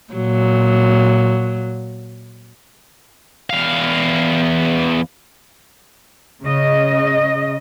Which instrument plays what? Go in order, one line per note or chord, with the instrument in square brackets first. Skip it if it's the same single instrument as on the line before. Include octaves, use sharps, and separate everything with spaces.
[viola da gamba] A#2 F#3
[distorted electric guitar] E2 F5
[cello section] C#3 D#5